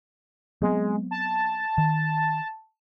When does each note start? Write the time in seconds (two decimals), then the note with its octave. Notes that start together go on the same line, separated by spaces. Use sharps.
0.62 F#3 G#3 B3 C4
1.11 A5
1.78 D#3